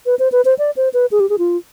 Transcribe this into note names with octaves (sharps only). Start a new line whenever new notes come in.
B4
C5
B4
C5
D5
C5
B4
G#4
G4
G#4
F4